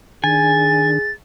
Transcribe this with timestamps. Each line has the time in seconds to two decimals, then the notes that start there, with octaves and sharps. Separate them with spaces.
0.24 D#3 D4 G#4 G#5 A6